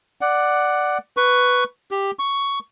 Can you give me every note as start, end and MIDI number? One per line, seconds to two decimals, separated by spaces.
0.21 0.98 74
0.21 0.98 78
1.17 1.64 71
1.17 1.64 85
1.91 2.11 67
2.19 2.59 85